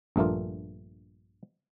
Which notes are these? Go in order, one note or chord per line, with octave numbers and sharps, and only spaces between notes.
A#1 G2 A3 A#3 F4